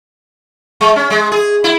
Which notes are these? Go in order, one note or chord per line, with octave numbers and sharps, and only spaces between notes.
G#3
C#4
G#3
G#4
E4